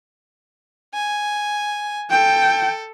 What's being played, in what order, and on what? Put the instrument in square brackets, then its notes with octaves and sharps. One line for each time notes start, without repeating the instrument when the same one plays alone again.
[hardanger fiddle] G#5
[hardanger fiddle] A4 [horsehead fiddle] G5